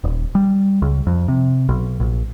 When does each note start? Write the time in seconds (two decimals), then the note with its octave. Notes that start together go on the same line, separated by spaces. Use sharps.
0.04 D#1
0.35 G3
0.82 C#2
1.07 F2
1.28 C3
1.69 B1
2.00 A#1